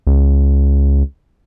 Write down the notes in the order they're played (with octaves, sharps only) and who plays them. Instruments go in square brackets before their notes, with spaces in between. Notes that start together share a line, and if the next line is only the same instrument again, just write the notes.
[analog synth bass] C#2